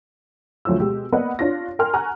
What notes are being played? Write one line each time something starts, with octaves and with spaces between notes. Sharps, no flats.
D2 F3 F#3 C#5 E6
B2 G#3 G4
A#3 B3 B4 D5 D#5 F#5
D4 F4 C#5 A#6
A#4 G5 G#5 C6 F6
F#5 G#5 A#5 C#6 F6 F#6